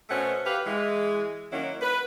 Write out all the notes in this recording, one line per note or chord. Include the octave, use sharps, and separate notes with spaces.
B2 A3 C#4 C5 F#5
G4 B4 F5
E3 G#3
D#3 F#3 A#3 C#4 E4
B4